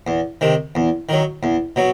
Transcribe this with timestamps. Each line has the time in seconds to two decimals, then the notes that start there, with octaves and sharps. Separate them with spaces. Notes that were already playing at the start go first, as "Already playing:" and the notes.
0.07 E2
0.41 C3 D#3
0.75 E2
1.09 D#3 F#3
1.43 E2
1.76 B2 F#3